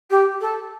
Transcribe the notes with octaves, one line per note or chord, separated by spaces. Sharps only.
G4
A4